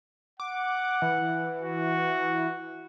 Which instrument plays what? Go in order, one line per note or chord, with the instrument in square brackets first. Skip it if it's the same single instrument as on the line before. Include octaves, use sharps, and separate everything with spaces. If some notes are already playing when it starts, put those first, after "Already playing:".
[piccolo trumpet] F#5 [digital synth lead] D6
[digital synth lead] E3
[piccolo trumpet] F#4